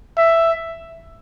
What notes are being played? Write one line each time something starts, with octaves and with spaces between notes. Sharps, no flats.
E5